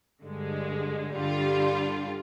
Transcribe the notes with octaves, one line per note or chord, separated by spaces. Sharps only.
G2 D3 G#3
G2 D3 G3 D4 F4